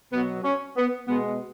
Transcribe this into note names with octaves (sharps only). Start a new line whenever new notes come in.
B2 F#3 B3
C#4
B3
B2 G#3 B3